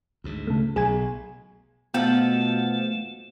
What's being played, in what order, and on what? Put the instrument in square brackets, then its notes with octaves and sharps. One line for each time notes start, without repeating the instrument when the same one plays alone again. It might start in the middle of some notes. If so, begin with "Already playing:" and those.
[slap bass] D2 G#2
[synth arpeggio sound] C#3 A3
[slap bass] B1 [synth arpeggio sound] G#4 G#5
[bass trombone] B2 [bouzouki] F3 A4 F#5 [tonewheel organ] A3 [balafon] B3